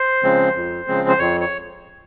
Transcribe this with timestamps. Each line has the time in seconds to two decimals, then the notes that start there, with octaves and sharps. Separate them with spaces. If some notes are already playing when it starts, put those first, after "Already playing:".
Already playing: C5
0.23 C#3 F3 G#3 C4
0.55 F2
0.87 C#3 F3 G#3 C4
1.09 C5
1.19 F2 C#5
1.41 C#5